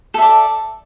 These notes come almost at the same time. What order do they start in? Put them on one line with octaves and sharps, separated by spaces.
A4 E5 D5